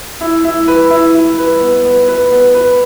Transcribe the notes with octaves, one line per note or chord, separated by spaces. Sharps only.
E4
E4
B4
E4
E4
B4
B3
B3
B4
B3
B4